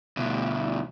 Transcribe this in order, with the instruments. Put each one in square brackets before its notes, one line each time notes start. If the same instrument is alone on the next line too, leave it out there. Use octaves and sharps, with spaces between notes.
[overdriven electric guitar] D2 B2